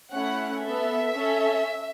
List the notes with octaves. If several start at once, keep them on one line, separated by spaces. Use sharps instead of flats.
A3 C#4 E4 F#5
B3 A4 E5
C#4 A4